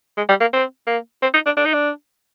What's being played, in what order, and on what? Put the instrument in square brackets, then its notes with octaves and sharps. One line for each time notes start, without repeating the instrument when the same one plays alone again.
[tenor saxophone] G#3
G3
A#3
C4
A#3
C4
D#4
D4
D4
D#4
D4